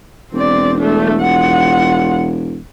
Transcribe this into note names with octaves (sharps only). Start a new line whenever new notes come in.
E1 C4 D5
A3 D4
F4 F#5